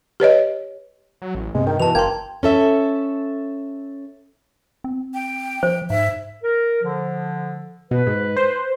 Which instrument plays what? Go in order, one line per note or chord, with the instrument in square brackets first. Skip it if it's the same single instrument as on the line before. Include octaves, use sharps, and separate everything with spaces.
[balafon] G4 B4 C#5 D#5
[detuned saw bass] F#3
A1
[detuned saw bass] G2 [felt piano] C3 [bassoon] G#3
[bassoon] D#3 [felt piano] G5
[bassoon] B2 [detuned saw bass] E3 [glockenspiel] A5 F7
[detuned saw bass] F#1 [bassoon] A#3 [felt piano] G5 [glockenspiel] C6 G#6
[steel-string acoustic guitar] C#4 A4 E5
[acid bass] C4
[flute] G5
[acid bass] F3 [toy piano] C5
[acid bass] G#2 [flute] E5
[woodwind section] A#4
D3 F3
[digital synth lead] B2 [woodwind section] B4
[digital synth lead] G#2
C5